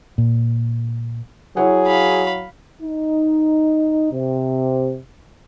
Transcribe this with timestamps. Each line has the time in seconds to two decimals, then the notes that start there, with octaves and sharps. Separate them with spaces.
0.18 A#2
1.57 F#3 E4 G#4 C#5 F#5
1.87 F5 B5
2.81 D#4
4.11 C3